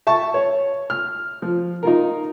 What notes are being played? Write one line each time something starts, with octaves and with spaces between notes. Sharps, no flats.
E5 A5 C#6
C#5
F6
F3
D#4 F4 A#4